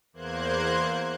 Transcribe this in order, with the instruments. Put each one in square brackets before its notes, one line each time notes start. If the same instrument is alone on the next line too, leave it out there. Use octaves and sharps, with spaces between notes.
[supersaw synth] E2 A#3 C5 F#6 G#6